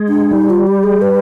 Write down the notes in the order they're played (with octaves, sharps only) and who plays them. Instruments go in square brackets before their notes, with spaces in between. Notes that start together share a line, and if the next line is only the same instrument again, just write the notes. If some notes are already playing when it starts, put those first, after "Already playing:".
Already playing: [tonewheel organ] G#3
[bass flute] D4
[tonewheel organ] G3 [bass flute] D#4
[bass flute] F4
G4
G#4
B4